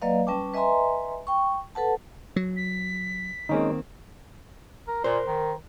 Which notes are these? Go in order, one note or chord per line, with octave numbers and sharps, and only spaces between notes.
F#3 A#3 B4 D5 D#5 F5
G3 C#4 B4 G5 A5 D6
B4 D#5 E5 G#5 A#5 C6
G5 C#6
A4 B4 F#5 A5
F#3
B6
D#3 G#3 A#3 C4 C#4 D#4
A#4
A#2 A#4 C5
D#3